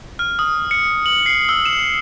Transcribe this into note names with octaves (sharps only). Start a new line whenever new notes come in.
F6
D#6
C#7
F#7
C7
E6
E7